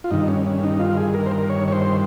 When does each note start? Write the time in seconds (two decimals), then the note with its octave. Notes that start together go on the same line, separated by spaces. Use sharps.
0.04 F4
0.11 G2 D#3 D#4
0.28 C#4
0.46 C#4
0.63 D#4
0.79 F4
0.97 G#4
1.14 A#4
1.26 C5
1.31 A#4
1.50 C#5
1.68 C#5
1.72 C5